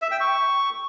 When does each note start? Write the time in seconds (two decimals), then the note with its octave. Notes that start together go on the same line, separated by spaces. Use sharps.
0.02 E5
0.11 G5
0.21 C#6